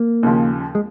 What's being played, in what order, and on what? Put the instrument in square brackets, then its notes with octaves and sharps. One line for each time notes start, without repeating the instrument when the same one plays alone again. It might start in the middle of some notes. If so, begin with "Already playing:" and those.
Already playing: [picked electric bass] A#3
[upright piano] D#2 C#3 F3
[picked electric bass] G#3